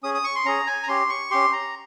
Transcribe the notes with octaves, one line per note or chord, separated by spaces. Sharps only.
C#4 G#4 D#6
D#6
C#6
C6
C#4 G#4 A#5
G#5
A#5
C#4 G4 C6
C#6
C#4 G4 C6
A#5